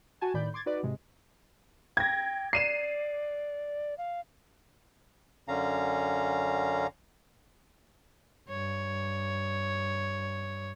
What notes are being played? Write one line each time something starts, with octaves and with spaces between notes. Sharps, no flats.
F#4 G#5 A5 G#6
A2 D#3 D5 B5 G6
C6 D6 G#6 A6
D#4 F#4 B4 D5
G#2 C3 G#3
G5 G#6 A#6
D5 C7 D#7 E7
F5
F#2 D3 C#4 F5 A#5
G2 C#5